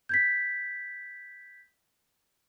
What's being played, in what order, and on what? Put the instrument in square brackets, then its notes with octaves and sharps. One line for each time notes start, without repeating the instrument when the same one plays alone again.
[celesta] G6 G#6 B6